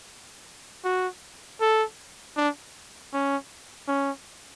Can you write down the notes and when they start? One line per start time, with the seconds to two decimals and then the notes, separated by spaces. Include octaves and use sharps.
0.85 F#4
1.61 A4
2.37 D4
3.14 C#4
3.88 C#4